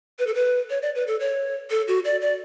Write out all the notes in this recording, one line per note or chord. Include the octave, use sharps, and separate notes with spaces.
B4
A4
B4
C#5
D5
B4
A4
C#5
A4
F#4
D5
D5